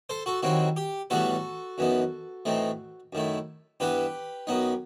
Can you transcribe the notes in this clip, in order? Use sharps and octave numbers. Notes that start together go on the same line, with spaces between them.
A4 C5
F#4 A4
D#2 D#3 F#3 C4 E4 F#4
G4
A2 E3 G3 B3 F#4 A4
F#2 E3 B3 D#4
A2 E3 A3 C4 D#4
F#2 D#3 A3 E4
G2 E3 B3 G4 B4
F#2 F#3 B3 D#4